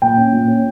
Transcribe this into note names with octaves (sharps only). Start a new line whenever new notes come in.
A#2 G5
C#4
A#2
C#4